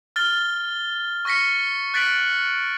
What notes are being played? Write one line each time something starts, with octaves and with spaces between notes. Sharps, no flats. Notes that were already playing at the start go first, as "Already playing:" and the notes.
F6 A6 G7
C#6 F6 A#6 B6 C#7
F#6 A6 B6 D7 F#7